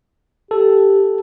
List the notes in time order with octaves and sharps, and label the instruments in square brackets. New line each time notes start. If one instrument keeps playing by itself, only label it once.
[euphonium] G4 [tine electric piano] A4